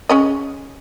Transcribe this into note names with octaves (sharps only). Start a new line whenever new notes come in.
G#3 C#4 D#5